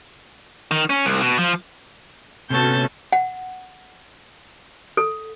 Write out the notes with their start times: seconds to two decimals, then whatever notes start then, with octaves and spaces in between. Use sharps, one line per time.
0.71 D#3
0.90 C#4
1.05 C2
1.21 B2
1.38 F3
2.50 C3 A3 B3 C#4 F#4 A5 G6
3.13 F#5
4.97 A4